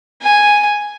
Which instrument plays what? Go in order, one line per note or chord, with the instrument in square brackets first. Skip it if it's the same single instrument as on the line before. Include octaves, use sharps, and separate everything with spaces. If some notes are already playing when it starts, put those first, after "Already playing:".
[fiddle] G#5